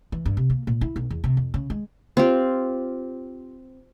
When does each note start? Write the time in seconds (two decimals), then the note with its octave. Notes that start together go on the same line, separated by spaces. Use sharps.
0.12 E3
0.26 G2
0.37 C3
0.50 A#3
0.67 A#2
0.81 E4
0.96 B1
1.11 E2
1.24 C3
1.37 F2
1.54 C#3
1.70 G#3
2.17 C4 F4 G4